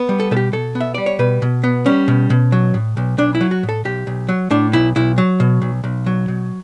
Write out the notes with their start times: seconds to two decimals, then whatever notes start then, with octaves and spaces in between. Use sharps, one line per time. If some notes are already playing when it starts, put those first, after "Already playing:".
Already playing: B3
0.09 G3
0.20 A4
0.31 B2 A4
0.37 G4
0.53 B2 A4
0.75 B3
0.80 E5
0.94 G3 D5
1.06 C#5
1.19 B2 B4
1.42 B2
1.64 B3
1.86 G3 C#4
2.08 B2
2.30 B2
2.52 F#3
2.74 A2
2.97 B1
3.18 B1 D4
3.35 E4
3.41 F#3
3.51 F#4
3.63 A2
3.69 A4
3.85 B1 G4
4.07 B1
4.29 F#3
4.50 A2 D4
4.73 B1 E4
4.96 B1 E4
5.18 F#3
5.40 B2
5.62 B1
5.84 B1
6.06 F#3
6.28 B2